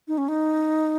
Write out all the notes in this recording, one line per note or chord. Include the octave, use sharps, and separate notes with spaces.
D#4
C#4
D#4